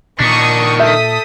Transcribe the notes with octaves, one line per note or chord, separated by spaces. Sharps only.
A#2 D#3 D4 C#6 D#6
A4 E5 D#6 G6 B6